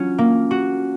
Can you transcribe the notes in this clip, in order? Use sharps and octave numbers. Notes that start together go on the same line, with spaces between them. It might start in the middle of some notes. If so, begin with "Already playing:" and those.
Already playing: F#3 C#4 F4
A#3
F#4